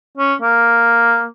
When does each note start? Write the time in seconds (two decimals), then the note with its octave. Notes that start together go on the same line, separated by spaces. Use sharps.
0.17 C#4
0.42 A#3